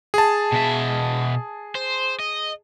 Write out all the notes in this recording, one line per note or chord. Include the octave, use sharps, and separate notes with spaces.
G#4 A5
B2 E5
C5
D#5